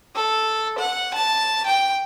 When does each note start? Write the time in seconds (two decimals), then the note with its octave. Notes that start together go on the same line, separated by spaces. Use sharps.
0.15 A4
0.79 F#5
1.14 A5
1.67 G5